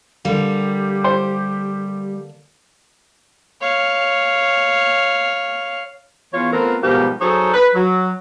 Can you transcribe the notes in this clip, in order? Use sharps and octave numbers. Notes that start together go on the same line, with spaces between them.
D3 G3 A#3 G4
C5
C#5 F5
E2 F4 C#5
A3 B3 C4 F4 A#4
G#2 B2 F3 G3 G4 A#4
F#3 D#4 G#4 A4 C5 C#5
B4
F#3